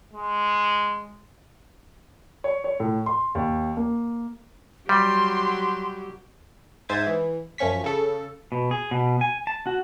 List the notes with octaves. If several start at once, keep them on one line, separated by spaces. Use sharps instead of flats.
G#3
C#5
C#5
A2
C6
D#2
A#3
F#3 G3 G4 C6
G#2 C5 E5 D#6 G#6 A6
E3
F#2 F3 C#4 C#6 B6
C#3 A4
B2
G#4
B2
G#5
A5
F#4